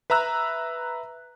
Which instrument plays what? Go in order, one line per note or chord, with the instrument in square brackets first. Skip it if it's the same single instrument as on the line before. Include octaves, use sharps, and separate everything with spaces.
[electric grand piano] B4 E5 A#5 E6 F#6